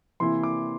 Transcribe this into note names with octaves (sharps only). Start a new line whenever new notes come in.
C3 E3 A#3 E4 C6
D6